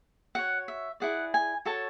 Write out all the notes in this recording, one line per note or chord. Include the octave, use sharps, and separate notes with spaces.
F#4 C#5 F#5
E5
E4 G#4 D5 F#5
G#5
F#4 A4 C#5 A5